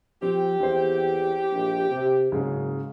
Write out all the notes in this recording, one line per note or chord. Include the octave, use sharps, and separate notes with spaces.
F3 C4 G4
E2 C4 C5
A#1
C3
F#1 G#2 C#3